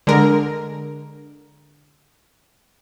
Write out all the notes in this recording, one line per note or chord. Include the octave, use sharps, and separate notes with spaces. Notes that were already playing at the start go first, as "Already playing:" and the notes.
D3 G#3 A#4